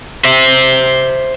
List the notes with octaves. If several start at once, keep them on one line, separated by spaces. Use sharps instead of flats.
C5 E5